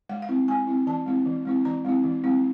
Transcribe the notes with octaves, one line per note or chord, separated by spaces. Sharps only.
G#3 F#5
F5
C4 E4
G#3 G#5
C4 E4
E3 A5
G#3 C4 E4
E3
G#3 C4 E4
E3 A#5
G#3 C4 E4
E3
G#3 C4 E4